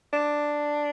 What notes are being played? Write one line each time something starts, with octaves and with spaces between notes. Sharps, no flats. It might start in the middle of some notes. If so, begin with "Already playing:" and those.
D4